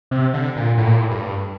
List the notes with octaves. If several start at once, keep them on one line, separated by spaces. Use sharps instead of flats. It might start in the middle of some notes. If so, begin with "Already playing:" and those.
C3
D3
A#2
A2
A#2
A2
G2